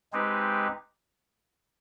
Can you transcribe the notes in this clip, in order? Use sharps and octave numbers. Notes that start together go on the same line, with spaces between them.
G#3 C4 D#4 G4 B4